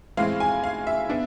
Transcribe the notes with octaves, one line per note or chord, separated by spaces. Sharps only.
A2 E3 G#3 C4 F5
G#5
F5
E5
B3 D4